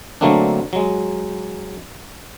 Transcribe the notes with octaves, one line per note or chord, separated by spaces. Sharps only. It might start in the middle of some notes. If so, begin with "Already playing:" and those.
D3 F#3 A3 A#3 C4 D4
F#3 G#3